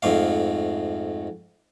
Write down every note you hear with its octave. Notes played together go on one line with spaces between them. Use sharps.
F2 G#2 A3 F5